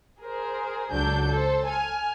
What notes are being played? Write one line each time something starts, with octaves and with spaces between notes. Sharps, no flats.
G#4 A#4 C5
C#2 F#3 D4 A4 G6
A4 C5
G#5 F6